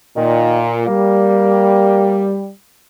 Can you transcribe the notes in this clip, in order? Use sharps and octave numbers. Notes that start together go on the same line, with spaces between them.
A#2 D#3
G3 A#3